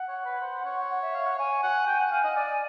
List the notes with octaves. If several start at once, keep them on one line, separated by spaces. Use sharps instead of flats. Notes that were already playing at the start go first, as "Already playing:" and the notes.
Already playing: F#5
C#5
B4
C5
C#5
F#5
E5
F5
F#5
C#5 G#5
F#5
G5
F#5
F5
D#5
D5